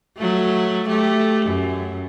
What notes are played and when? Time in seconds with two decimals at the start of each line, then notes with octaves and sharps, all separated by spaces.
0.17 F#3 A3
0.89 A3 G4
1.46 F#2